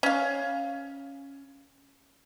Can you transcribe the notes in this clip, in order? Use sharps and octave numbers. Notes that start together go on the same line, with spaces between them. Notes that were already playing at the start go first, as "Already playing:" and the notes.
C#4 F5